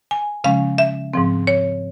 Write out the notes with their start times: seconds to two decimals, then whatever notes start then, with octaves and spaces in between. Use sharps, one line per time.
0.11 G#5
0.44 C#3 F3 G#3 C#4 F5
0.78 E5
1.14 G#2 F3 C4
1.47 C#5